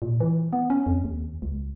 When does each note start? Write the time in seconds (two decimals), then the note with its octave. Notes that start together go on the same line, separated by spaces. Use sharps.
0.02 A#2
0.20 E3
0.53 B3
0.70 C#4
0.86 F2
1.04 D#2
1.42 C#2